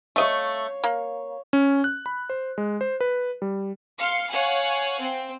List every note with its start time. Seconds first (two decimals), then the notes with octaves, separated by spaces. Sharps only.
0.16 A3 C#5 D#5 F5
0.84 A#3
1.53 C#4
1.84 F#6
2.06 B5
2.30 C5
2.58 G#3
2.81 C5
3.01 B4
3.42 G3
3.98 F5 C6 F6 C#7
4.30 C#5 F5 F#5 G#5
5.01 C4